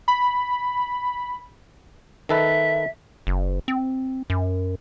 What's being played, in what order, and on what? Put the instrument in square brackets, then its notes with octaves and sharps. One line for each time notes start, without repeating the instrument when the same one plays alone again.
[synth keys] B5
[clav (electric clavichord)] D#3 A4 B4 [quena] E5
[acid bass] F#1
C4
F#2